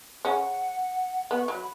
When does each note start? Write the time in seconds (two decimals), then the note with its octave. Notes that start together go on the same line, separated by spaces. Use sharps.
0.24 C#3 C#4 F#5
1.30 B3 F#5
1.40 C#6
1.47 F#3 B5